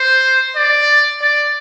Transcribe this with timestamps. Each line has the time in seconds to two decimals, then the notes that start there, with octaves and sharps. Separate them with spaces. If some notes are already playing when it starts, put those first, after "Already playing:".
Already playing: C5
0.56 D5
1.21 D5